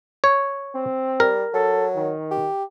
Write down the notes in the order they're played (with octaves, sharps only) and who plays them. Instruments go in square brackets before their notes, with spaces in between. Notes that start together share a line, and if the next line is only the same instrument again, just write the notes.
[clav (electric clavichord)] C#5
[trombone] C4
[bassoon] G3 [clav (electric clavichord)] A#4
[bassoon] F#3 [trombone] A4
[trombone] D#3
[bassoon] G4